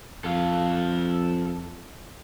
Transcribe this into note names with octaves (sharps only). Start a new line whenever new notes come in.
F2 A4 F5